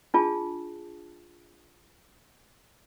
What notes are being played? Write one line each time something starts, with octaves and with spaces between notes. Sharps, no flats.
D4 F4 G#4 A5